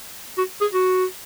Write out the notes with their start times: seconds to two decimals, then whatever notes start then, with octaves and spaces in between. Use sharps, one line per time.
0.38 F#4
0.61 G#4
0.73 F#4